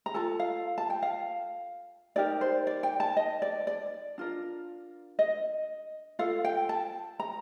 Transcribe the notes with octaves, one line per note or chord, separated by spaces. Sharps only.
A#5
F4 A4 A5
F5
A5
G5
F5
D#4 G4 A#4 D5
C5
D5
G5
A5
D#5
D5
D5
D4 F4 A#4
D#5
F4 A4 F5
G5
A5
A#5